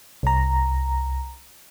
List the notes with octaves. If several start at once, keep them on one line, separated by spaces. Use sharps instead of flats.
C2 A#5